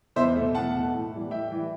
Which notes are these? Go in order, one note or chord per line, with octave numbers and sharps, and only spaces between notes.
E2 C5 E5
B2 A3
E2 F#5 A5
B2 A3
A2
E3 G3
A2 E5 G5
E3 G3